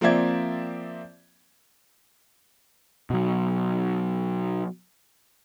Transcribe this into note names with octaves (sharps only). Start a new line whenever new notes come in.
F3 A#3 C4 D5 E5 G#6
B2 F#3